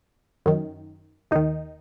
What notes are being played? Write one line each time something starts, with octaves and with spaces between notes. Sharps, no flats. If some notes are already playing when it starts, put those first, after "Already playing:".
F#2 D#3
D#2 D#3 D#4